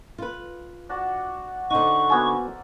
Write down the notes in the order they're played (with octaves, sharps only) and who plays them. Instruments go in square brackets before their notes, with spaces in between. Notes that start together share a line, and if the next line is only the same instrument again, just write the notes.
[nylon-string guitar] F4 B4
[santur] D4 F#4 A5
[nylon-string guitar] D3 D#4 [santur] C5 F#5 [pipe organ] C#6
[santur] A#3 A4 [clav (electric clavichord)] B3 F#4 G#5